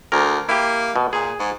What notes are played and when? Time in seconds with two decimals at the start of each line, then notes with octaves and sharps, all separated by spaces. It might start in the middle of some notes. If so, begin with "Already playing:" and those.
0.12 D2 A#4
0.49 A#3 E4 G4
0.96 B2
1.13 A#2 G#4
1.40 G#2